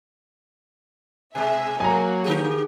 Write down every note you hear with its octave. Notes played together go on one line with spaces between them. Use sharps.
B2 G#3 G#4 E5 G#5
F#3 A#3 F#4 G#5 A#5
D3 G4 G#4